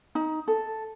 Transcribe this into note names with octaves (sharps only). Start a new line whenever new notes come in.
D#4
A4